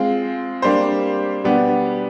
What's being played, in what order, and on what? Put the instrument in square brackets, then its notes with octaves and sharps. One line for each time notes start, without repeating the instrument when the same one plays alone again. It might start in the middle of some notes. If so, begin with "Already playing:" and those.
Already playing: [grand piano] G#3 C4 F4
G3 A#3 D4 G4 C5
B2 G3 B3 D4 G4